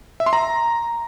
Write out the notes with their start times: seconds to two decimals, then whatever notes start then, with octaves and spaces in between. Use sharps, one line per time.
0.20 E5
0.26 C6
0.33 A#5